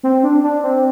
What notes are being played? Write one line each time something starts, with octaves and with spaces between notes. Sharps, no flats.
C4
D4
D4
C4